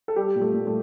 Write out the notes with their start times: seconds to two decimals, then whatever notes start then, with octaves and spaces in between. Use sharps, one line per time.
0.08 A4
0.16 G3 G4
0.36 A#2
0.41 A3
0.54 A#2
0.67 A3